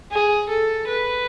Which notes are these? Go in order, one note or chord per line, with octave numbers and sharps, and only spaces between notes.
G#4
A4
B4